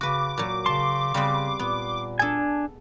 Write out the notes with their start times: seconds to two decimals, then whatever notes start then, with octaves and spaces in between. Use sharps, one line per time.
0.01 C#3 F#4 B4 D6
0.38 A#2 F#3
0.66 C#3 A5 C6
1.14 C#3 G3 B3 C4
1.59 A#2 B3
2.19 D4 G#4 A4 G#5